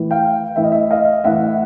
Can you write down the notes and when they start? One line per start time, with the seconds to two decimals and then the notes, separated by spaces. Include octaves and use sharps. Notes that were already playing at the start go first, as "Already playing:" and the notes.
Already playing: A2 E3
0.11 F5 G5
0.56 A2 E3 E5
0.64 D#5
0.72 E5
0.91 D#5 F5
1.24 A2 E3 E5 F#5